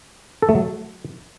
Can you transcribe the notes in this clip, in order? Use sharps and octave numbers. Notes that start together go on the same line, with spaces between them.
A4
A3
F#3